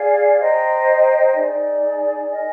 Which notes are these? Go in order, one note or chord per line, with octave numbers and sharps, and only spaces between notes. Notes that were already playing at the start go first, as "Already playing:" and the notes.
Already playing: G#4 D5 F5
C5 D#5 G5 A#5
D#4 G#4 D5
A#4 D#5 G#5